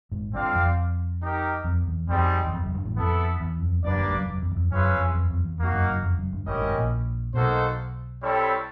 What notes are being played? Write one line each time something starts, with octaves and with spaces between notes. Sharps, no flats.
G#1 G#2
G1 G2 C4 F4 A4 D5 F5
F2
D#4 G4 A#4
F2
E2
F2 G3 C4 D#4 G#4
E2
F2
F#1 F#2
G1 G2
A1 A2
F2 B3 E4 A4
E2
F2
F#1 F#2 A#3 D4 G4 B4 D5
G1 G2
G2
F#1 F#2
F#1 F#2
F2
E2
F2
F#1 F#2 C#4 F4 G#4 B4 E5
F2
F2
F2
E2
F2 A#3 D#4 F#4
F#1 F#2
F#1 F#2
F2
F#1 F#2
G1 G2
G1 G2 C#4 E4 G4 A#4 D#5
A2
G#1 G#2
A#1 A#2
B1 B2 A#3 D#4 F#4 A4 C5
G3 C4 E4 A4 C#5